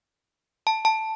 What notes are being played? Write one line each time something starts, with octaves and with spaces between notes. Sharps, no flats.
A5
A5